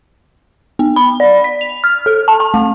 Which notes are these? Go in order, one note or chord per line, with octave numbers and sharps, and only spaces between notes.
B3
B5
D5
B6
F7
F6
A4
A5
A5
A3